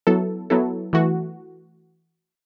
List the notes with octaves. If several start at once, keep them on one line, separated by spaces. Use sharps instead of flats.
F#3 B3 E4 A4
F#3 B3 E4 A4
E3 A3 F#4